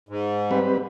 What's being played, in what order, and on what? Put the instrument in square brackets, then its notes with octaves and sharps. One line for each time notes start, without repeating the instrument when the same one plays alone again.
[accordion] G#2
[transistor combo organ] G3 C4 B4